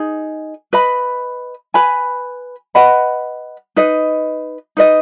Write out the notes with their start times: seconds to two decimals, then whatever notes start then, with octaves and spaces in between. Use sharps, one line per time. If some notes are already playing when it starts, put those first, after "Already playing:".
Already playing: D#4 G#4
0.73 B4 D#5 B5
1.74 B4 G#5 B5
2.75 B4 D#5 F#5 B5
3.76 D#4 B4 D#5
4.77 D#4 B4 D#5